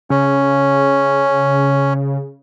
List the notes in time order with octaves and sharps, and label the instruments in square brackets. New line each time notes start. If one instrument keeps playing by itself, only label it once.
[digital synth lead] C#3 [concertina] C#4